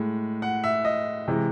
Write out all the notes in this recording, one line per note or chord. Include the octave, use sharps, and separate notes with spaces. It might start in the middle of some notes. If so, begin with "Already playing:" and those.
Already playing: A2 G#3
F#5
E5
D#5
C3 E3 G#3